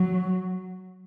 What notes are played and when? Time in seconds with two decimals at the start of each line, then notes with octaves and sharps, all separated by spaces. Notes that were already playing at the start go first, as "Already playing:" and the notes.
Already playing: F#3